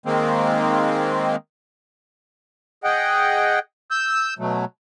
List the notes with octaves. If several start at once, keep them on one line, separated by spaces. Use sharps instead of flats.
D#3 G#3 A#3 C4
G#4 D#5 F#5 G5
E6 G6
B2 F#3 A3